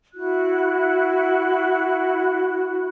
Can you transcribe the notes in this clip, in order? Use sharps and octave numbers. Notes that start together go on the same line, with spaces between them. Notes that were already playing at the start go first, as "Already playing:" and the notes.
E4 F#4 F#6